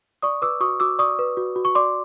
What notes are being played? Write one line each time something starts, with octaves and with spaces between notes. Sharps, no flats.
D5 C#6 D#6
B4 D6 E6
F#4 C#6 D#6
F#4 D6 E6
D5 C#6 D#6
B4
F#4
F#4
C#6
D5 C6 D6